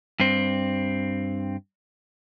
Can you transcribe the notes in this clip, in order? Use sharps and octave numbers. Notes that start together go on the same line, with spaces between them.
G2 C4